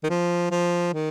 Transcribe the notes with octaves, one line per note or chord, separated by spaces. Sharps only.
D#3
F3
F3
D#3